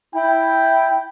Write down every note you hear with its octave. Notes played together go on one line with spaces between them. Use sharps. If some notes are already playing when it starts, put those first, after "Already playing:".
E4 G5